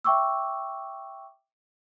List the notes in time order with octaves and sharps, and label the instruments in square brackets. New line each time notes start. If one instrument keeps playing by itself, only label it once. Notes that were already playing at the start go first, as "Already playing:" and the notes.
[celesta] E5 G5 C#6 D6 E6